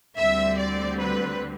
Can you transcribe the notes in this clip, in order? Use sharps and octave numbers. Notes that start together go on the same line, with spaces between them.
D2 D3 G3 C4 E5
D5
B4